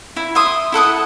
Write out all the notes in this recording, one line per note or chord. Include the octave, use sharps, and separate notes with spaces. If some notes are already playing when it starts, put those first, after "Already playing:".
E4
E5 C6 D#6
E4 A4 F#5 D#6